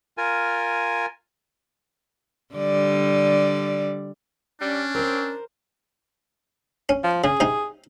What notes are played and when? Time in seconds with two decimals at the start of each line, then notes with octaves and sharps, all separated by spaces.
0.18 F4 A#4 G#5
2.55 D3 G3 D5
4.61 G3 C#4 D4
4.95 C4 A#4 C5
6.89 C#4
7.04 F3
7.24 C#3 G#4
7.40 C3 D#4